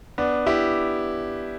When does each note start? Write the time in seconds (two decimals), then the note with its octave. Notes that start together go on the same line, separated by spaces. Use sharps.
0.18 B3 D4
0.46 E4 G4